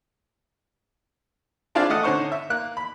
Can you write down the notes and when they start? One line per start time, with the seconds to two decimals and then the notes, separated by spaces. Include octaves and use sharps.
1.75 C4 D4 E4 F4 G#4 D5
1.90 A3 D#5 F#5
2.04 D3 C#4 D#4 C5 F#5 C#6
2.32 E5
2.50 A#3 F#6
2.77 B5